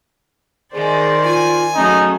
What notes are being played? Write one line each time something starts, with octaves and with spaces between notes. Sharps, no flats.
D#3 G#3 G#4 C5 D5
F4 G#5
F#3 A3 C#4 D#4 G#4